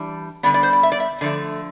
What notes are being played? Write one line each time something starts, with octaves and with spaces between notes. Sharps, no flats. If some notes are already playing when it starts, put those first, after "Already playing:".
Already playing: E3 G3 D4
D3 G3 B3 D5
D5
C5
D5
E5
D5
E5
D3 F3 A3 D5